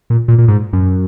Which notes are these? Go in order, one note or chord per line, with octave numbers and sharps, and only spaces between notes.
A#2
A#2
A#2
G#2
F#2